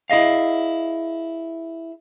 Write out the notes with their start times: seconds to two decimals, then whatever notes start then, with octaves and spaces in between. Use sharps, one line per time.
0.10 E4 G#4 D#5 F5